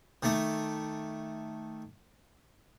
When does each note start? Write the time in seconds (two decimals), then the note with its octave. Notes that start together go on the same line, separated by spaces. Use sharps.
0.23 D#3 A3 D6